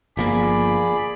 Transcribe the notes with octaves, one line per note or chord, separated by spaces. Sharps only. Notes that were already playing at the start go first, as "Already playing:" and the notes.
G1 F3 A#3 G#4 D5 B5